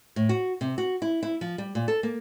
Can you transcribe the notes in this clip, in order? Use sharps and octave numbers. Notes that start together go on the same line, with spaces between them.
A2
F#4
C3
F#4
E4
E4
F3
G3
A#2
A4
A#3